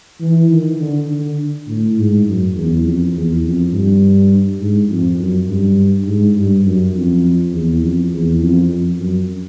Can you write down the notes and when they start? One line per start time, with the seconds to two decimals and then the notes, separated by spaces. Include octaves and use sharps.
0.20 E3
0.50 D#3
0.79 D3
1.08 D3
1.67 A2
1.97 G#2
2.26 F#2
2.55 E2
2.84 F2
3.13 E2
3.43 F2
3.72 G2
4.60 G#2
4.89 F2
5.18 F#2
5.48 G2
6.06 G#2
6.35 G2
6.64 F#2
6.94 F2
7.52 E2
7.82 F2
8.11 E2
8.41 F2
8.69 F2
8.98 F#2